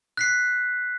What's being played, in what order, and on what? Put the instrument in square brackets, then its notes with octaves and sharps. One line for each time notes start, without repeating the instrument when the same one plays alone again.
[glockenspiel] F#6 B6 C7